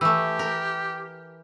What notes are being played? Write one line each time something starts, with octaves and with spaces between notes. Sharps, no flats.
E3 A3 G4 E6
A#4